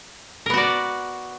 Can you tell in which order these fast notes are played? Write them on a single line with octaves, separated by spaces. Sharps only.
A#4 B3 F#4 D5